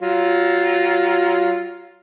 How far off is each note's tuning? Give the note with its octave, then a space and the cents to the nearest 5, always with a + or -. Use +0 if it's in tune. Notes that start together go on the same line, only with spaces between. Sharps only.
F#3 +25 F4 +0